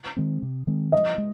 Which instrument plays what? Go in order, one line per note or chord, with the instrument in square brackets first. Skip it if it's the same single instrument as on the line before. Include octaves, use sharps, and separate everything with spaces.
[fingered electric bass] D#3 G#3 C4
C3
D#3 G#3 C4
[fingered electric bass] F3 [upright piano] D#5
[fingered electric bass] G#3